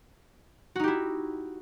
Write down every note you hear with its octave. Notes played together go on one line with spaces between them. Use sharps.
D#4 E4 F#4 G4